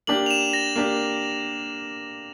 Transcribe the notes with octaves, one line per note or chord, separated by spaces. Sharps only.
A#3 D4 G4 F#7
F7
E7
A#6
A#3 D4 G4